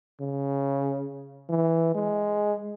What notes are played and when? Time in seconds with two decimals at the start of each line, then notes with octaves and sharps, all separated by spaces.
0.21 C#3
1.50 E3
1.95 G#3